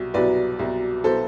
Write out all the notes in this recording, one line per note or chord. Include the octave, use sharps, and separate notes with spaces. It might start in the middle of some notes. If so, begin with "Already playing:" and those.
Already playing: C2 B2 F#3
C2 B2 F#3 B4 D5
C2 B2 F#3
B2 F#3 A4 C5